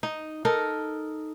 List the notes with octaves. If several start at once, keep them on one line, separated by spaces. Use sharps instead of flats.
D#4
D#4 A4 A#4